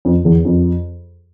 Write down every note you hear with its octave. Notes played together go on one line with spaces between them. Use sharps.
F2
E2
F2